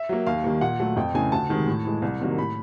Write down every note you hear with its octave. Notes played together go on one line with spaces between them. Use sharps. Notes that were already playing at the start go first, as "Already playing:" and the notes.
Already playing: E5
F#3 A#3
D#2 F5
D#3 G3 A#3
A#2 F#5
F#3 A3
F2 G5
C#3 E3 A3 G#5
D2 A5
C3 D#3 G#3
A2
E3 G#3
C2
C3 D#3 F#3 A#3
A2 B5